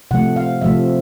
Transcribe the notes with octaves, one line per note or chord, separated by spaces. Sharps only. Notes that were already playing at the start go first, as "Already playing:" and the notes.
C3 F3 A3 F#5
F5
C3 F3 A3 E5